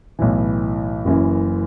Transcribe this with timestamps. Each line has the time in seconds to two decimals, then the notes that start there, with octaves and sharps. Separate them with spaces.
0.19 B1 A2 E3
1.05 F#1 F#2 E3